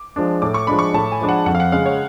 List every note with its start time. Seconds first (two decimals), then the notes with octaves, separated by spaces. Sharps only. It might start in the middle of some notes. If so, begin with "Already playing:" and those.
Already playing: D6
0.16 F3 G#3 D4
0.42 A2 D6
0.54 C#6
0.67 F3 G#3 D4 B5
0.79 C#6
0.94 A2 A5
1.12 G#5
1.21 F3 G#3 D4
1.29 F#5
1.46 F2 F#5
1.55 F5
1.60 F#5
1.72 C#3 G#3 F5
1.86 C#5